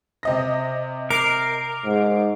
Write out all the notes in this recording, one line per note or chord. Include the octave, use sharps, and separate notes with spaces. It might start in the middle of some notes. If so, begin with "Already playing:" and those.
C3 D#5 A#6
A#4 D6 C7 D7
G#2